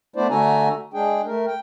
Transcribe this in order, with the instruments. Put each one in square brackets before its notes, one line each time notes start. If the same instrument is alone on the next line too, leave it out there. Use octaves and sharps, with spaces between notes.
[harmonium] A3 B3 D4 E4 C5 D5
D3 A3 F#4 A4 G#5 A#5
G#3 D4 G#4 G5
A3 A#4
G5